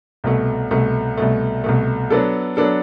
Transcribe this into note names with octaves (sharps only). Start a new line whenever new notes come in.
C2 B2 A3
C2 B2 A3
C2 B2 A3
C2 B2 A3
F#3 B3 D4 A4
F#3 B3 D4 A4